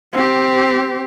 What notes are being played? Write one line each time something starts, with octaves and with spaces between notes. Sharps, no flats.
C4 G4